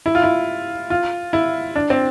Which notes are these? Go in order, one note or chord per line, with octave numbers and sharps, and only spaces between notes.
E4
F4
E4
F4
E4
D4
C4